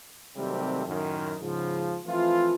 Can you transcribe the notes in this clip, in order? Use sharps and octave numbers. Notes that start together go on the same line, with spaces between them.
C3 D#3 F#3 G3 A3 C4
F#2 A2 D#3
G#2 C#3 F3
E3 F3 A3 C4 F4